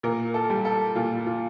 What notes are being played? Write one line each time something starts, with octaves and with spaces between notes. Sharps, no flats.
A#2 A#4
A4
G3
A4
A#2 F4
F4